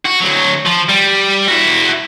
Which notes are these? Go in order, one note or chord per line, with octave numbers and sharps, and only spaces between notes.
F#4
D2 F#3
F3
G3
E4 F#4